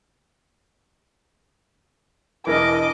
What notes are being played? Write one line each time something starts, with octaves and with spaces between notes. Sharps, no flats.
E1 E3 A#4 D#5 D6